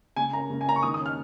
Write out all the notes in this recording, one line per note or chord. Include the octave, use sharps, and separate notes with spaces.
C#3 G#5
A#3 C#4 A#5
C#3
G#5
A#3 C#4 A#5
C#6
D#3 D#6
D#6
C#4
F6